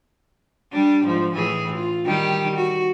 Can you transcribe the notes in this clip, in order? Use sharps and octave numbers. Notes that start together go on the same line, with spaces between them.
G3 D4
G#2 F3
A2 E3 G#4
F4
D#3 G3 G4
F#4